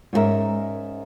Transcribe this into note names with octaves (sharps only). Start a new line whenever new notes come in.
G#2 C#4 F4 F#4 A#4 E5